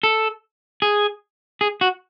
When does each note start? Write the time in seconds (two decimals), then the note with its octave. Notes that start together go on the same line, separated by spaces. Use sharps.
0.03 A4
0.82 G#4
1.61 G#4
1.81 F#4